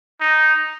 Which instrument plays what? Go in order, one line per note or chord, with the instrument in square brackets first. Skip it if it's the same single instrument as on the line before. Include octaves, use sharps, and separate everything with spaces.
[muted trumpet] D#4